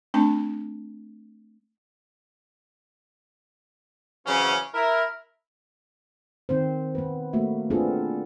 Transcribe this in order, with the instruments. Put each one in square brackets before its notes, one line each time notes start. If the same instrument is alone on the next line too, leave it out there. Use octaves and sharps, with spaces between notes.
[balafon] A3 C4 D4 A5
[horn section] C#3 E3 F#3 C4 C#4
E4 A#4
[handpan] D#3 C4 D#4 C5
B3 B4
A3 A#3 F#4 E5
B3 C4 D4 F4 G#4 A4